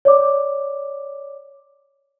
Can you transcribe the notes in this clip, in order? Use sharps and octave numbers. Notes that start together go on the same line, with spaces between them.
C#5 D5 D6